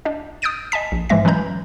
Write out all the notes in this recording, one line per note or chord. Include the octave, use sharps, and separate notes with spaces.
D4 D#5
D#6 F6 G6 A6 D7 D#7
D#5 G#5 A5 B6
A#1
G#2 E3 F3 G#3 E5 A#6
E3 F#3 G#3 C#4 A#5 G6